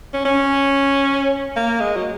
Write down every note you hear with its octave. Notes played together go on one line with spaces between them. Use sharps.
C#4
C#4
A#3
G#3
F#3